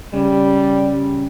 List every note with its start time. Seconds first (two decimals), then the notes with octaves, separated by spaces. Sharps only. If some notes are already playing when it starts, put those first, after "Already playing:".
0.14 C#3 G3